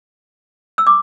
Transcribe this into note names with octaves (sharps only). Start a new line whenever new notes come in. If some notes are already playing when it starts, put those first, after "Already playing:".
E6
D6